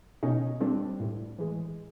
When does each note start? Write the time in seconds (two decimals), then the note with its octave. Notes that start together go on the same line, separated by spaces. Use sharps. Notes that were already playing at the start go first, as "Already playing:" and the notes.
0.23 B2 C#4 D#4
0.61 G3 C4 D4
1.00 A2
1.38 E3 G#3